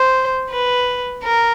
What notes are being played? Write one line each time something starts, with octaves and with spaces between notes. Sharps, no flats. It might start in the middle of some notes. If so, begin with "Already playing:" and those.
Already playing: C5
B4
A#4